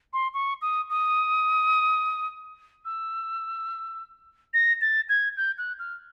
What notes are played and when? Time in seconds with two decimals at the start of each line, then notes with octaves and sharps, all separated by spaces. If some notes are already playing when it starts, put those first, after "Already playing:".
0.13 C6
0.34 C#6
0.62 D#6
0.90 D#6
2.85 E6
4.54 A#6
4.81 A6
5.09 G#6
5.37 G6
5.58 F#6
5.79 F6